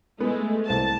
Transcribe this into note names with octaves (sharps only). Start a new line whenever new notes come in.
G#3 A3 B3
C2 C5 A5